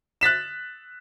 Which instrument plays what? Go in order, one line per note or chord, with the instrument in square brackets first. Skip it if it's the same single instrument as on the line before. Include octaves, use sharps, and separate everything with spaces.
[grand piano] F#6 A6 B6 E7